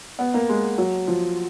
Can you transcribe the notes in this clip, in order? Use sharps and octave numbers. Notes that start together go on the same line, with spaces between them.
B3
A#3
G#3
F#3
F3